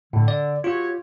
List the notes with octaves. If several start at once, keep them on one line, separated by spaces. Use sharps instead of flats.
A2 D3
D5
F#3 F4 G4 C#5